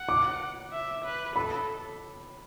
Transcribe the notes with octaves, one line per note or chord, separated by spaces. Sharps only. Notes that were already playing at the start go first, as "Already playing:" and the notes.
Already playing: F#5
D6
E5
B4
A4 B5